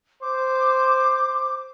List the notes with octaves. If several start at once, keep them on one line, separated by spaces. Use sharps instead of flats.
C5 D6